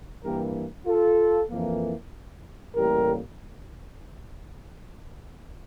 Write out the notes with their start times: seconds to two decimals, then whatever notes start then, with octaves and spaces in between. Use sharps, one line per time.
0.23 G2 E3 A#3 G4 A#4
0.86 F4 A4
1.50 F2 E3 A#3
2.74 A1 A2 G3 A#3 G4 A#4